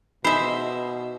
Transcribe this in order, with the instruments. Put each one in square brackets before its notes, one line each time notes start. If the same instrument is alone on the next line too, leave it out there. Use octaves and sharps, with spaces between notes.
[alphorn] B2 [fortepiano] D#4 G#4 D#5 [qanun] C5 E5 [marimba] B5